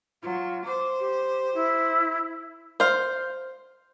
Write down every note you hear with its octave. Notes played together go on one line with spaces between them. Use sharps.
F#3 F4
C5 D6
G4
E4
C5 F5